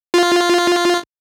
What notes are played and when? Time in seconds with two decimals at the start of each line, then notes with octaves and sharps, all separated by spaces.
0.14 F4